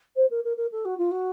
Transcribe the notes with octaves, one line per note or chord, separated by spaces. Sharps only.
C5
A#4
A#4
A#4
A4
F#4
F4
F#4